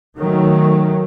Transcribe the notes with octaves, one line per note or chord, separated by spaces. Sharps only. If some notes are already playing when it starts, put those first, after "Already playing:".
D#3 F#3 A3